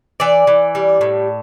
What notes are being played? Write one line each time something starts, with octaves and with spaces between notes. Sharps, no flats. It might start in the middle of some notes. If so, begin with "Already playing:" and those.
E3 D5
E3
G3
A2